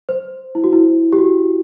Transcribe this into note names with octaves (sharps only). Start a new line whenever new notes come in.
C5
E4
F#4
E4
G4
F#4